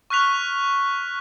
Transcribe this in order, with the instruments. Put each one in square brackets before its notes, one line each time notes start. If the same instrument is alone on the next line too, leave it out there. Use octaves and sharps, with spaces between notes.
[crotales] C#6 F6 F#6 B6 F7